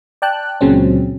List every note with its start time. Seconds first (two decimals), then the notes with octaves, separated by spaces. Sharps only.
0.22 D5 G5 A5 F#6
0.61 C#2 A#2 C#3 F#3 C4 C#4